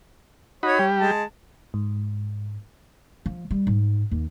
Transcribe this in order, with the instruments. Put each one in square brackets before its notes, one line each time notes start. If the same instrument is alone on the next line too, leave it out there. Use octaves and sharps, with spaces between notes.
[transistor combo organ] D#4 F#4 B5 [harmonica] C#5
[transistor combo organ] G3 G4
[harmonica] G#3 A5
[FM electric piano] G#2
[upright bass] F3
G3
G#2
D#2